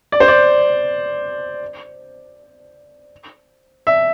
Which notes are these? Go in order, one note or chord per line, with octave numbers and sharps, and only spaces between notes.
D5
C5
D5
E5